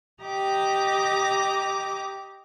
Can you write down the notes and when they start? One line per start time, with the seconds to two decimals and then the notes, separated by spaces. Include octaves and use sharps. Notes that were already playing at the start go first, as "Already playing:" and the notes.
0.24 G4 D#5 A#5 D6